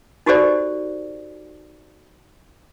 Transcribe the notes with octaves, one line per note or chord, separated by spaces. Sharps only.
D#4 F#4 G4 A4 C5 D5